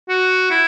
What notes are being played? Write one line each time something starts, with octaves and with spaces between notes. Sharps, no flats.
F#4
E4